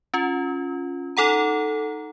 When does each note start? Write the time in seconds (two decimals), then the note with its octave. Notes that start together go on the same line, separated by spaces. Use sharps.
0.14 C#4 F4
1.17 D#4 A4 F#5 A#5